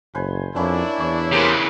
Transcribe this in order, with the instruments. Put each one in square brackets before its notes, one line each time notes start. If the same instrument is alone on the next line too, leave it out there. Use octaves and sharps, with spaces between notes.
[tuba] F#1 [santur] B4 C5 G#5
[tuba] F2 [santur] A#3 C#4 B4 [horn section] D4 E4
[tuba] E2 [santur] C#5
[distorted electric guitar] C#3 E3 [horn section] A#3 G4 C5 [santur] A#4 G#5 C6